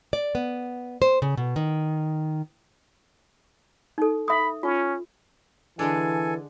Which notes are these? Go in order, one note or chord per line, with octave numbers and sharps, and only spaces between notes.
D5
B3
C5
C#3
B2
D#3
D#4 A4
E5 B5 D#6
C#4 F4
D3 E3 G#3 D4 A4 G#5